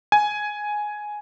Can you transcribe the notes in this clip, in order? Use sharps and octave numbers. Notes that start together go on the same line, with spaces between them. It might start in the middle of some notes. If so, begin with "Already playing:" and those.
G#5